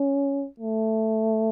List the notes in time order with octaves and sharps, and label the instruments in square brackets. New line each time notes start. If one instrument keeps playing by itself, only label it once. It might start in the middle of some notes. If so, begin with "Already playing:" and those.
Already playing: [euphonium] C#4
A3